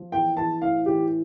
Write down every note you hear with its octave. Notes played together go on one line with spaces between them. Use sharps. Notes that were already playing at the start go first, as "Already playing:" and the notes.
Already playing: F3
E3 G5
E3 A5
A2 F5
E3 G4